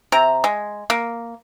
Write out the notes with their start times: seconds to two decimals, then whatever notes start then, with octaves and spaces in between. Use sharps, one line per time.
0.12 C3 A#5
0.44 G#3
0.90 A#3